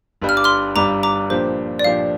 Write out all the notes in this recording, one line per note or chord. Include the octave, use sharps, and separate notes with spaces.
G1 G2 G3
F6
D6
C6 F6
G1 G2 G3 A#5 D6
A#5 D6
A#2 F3 D4 G4 C5
D5
A#2 F3 D4 G4 F5